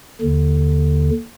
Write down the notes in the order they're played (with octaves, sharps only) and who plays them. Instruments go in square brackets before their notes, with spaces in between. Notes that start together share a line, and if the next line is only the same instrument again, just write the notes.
[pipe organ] D#2 D3